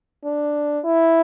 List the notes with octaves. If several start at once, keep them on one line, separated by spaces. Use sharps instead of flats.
D4
E4